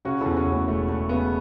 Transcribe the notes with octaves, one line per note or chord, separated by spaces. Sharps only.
C#3 C#4 F#4
E2 E4 A4
C#4 F#4
E2
A3 C#4
E1 A3
E1 A3
C#3 B3